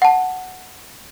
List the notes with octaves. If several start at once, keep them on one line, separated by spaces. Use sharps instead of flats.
F#5 A5